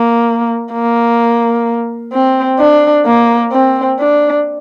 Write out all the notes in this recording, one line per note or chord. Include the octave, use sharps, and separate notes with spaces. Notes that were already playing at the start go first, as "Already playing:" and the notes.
Already playing: A#3
A#3
C4
D4
A#3
C4
D4